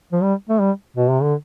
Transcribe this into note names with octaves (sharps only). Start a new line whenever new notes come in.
F3
G3
A3
G3
B2
C3
D3